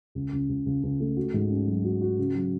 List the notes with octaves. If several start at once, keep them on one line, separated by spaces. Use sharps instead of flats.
C#2
C#2
C#2
C#2
C#2
A3
F#4
G#2
C#4
F#3
F#4
F#4
C#3
F#3